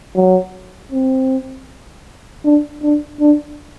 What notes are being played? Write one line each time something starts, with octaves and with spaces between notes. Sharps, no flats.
F#3
C4
D4
D4
D4